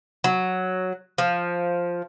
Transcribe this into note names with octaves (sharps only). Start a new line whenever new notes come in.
F#3
F3